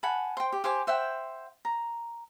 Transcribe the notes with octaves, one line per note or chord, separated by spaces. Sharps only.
F#5 G#5 A5 B5
C5 G5
G4
G4 C5 G#5 D6
C5 E5 F#5 G5
A#5